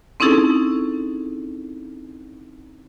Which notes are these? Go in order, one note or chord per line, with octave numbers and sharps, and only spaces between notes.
C4 C#4 D#4 E4 G#4 A4